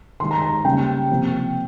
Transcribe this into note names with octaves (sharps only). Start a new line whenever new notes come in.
D#3 G#3 C6
A#5
A#5
C#3 G3 A#3 G5
C3 F3 A#3